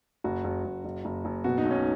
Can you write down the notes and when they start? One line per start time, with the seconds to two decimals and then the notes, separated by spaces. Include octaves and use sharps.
0.24 F#1 F#4
0.44 F#1
0.64 F#1
0.84 F#1
1.05 F#1
1.25 F#1
1.44 B2 F#4
1.58 D#4
1.65 B1
1.71 C#4